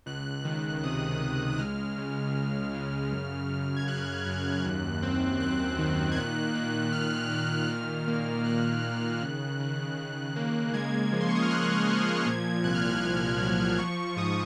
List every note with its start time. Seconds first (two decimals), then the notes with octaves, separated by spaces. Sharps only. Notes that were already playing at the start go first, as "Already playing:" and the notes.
0.06 C#2 F#6
0.45 D#3
0.84 C3 D#6
1.21 C#2
1.52 F#6
1.59 G#3 F6
1.98 C#3
2.36 C#3
2.74 C#3
3.12 F#2
3.49 F#2
3.76 G#6
3.87 C#3 F#6
4.26 F#2
4.64 D#2
5.03 C4
5.40 D#2 F#6
5.78 D#3
6.12 G#6
6.17 A#2 F#6
6.55 A#2
6.92 A#2 F6
7.31 A#2
7.68 D#3 F6
8.07 A#3
8.45 D#3 F#6
8.83 D#3
9.22 C#3
9.60 C#3
9.98 C#3
10.36 A#3
10.74 G#3 G#6
11.12 F3
11.21 C6
11.28 C#6
11.35 D#6
11.42 F6
11.50 F3 F#6
11.89 F3
12.26 A#2 G#6
12.64 C2 F#6
12.75 F6
12.84 F#6
12.94 F6
13.02 A#2 F#6
13.40 F#3
13.78 F3 C#6
14.16 G#2 D#6